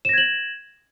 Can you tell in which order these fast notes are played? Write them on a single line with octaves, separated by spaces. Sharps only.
E7 A#6 G#6 F#7